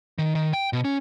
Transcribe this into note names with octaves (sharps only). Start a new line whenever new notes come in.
D#3
D#3
G5
B2
C#4